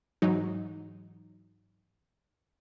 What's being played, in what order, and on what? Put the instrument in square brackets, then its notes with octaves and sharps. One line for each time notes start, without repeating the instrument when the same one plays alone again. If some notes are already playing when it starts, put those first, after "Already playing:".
[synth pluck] G#2 E3 F#3 D#4